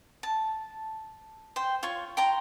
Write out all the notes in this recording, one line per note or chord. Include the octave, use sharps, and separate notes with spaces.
A5
C5 G5
F4 C#5 C#6
G5 A#5 C6